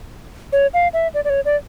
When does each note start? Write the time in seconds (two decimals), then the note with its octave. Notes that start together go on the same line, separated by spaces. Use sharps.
0.52 C#5
0.74 F5
0.93 E5
1.14 D5
1.25 D5
1.30 C#5
1.45 D5